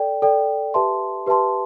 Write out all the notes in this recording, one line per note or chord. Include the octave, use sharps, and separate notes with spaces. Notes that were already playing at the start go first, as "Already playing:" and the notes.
Already playing: A4 D5 G5
A4 D5 G5
G4 B4 E5 A5 C6
G4 B4 E5 A5 C6